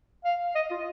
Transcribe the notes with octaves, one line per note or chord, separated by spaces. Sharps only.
F5
D#5
F4